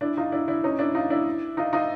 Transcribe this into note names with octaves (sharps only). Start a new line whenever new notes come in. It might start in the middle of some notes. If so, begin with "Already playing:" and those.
D4 E4
D#4 F4
D4 E4
D4 E4
C#4 D#4
D4 E4
D#4 F4
D4 E4
D#4 F4
D#4 F4